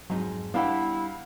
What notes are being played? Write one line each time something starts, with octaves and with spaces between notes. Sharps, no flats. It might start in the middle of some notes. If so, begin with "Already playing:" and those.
F2 G#2 F#3 D#4
G3 B3 D4 E4 G4 F5 F#5